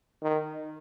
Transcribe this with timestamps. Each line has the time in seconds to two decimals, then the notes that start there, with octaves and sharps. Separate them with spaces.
0.23 D#3